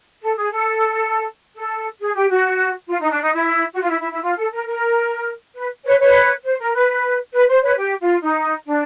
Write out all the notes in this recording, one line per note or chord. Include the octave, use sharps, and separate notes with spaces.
A4
G#4
A4
A4
G#4
G4
F#4
F4
D#4
D4
D#4
E4
F#4
F4
E4
E4
E4
F4
A4
A#4
A#4
B4
B4 C#5
B4 C#5
C5
A#4
B4
B4
C5
B4 C#5
G4
F4
D#4
D4